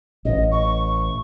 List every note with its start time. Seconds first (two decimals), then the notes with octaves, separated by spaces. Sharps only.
0.25 A1 D#5
0.52 C#6